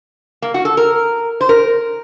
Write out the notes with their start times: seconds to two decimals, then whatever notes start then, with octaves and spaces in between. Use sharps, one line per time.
0.42 A#3
0.54 F#4
0.65 A4
0.77 A#4
1.41 C5
1.49 A#4